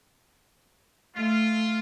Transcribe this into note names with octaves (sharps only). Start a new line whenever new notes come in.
A3 F4